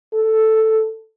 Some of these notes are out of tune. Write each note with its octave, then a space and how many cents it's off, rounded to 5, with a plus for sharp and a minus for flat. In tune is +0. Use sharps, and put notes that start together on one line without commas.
A4 +0